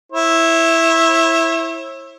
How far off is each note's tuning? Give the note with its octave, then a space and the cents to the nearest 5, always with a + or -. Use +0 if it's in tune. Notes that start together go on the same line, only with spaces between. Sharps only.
E4 +0 C#5 -45